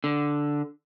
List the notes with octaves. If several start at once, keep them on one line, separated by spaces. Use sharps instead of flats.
D3